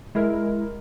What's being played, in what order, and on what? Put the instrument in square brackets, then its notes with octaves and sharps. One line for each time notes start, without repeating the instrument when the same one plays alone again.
[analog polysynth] G#3 E4 A#4